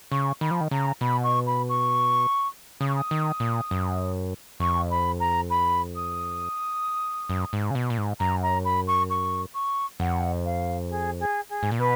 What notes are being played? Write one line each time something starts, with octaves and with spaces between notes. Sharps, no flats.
C#3 C#6
D#3 B5
F3
D#3
C#3 A#5
B2 B5
C#6
B5
C#6
C#3 D#6
C#6
D#6
D#3
A#2
F#2
F2 C#6
B5
A#5
B5
D#6
F#2
G#2
C#3
B2
A#2
G#2
F#2 A#5
A#5
B5
C#6
C#6
C#6
F2 F#5
F5
G#4
G#4
G#4
G#2
A#2
B2 B4